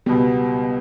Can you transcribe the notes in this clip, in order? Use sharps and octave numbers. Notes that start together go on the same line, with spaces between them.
C#2 B2 G3 B3